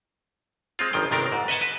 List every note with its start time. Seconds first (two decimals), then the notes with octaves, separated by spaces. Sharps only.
0.79 G#3 C4 F4
0.93 G1 D#3 F3 G5
1.11 G1 C3 D#3 D4 A#4
1.32 G#2
1.48 B4 D#5 E5 F#5 G#5 A5
1.62 B4